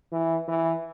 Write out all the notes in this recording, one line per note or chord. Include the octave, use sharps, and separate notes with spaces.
E3
E3